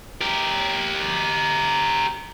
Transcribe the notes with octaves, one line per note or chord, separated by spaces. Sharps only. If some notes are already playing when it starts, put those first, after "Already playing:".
G4 A#4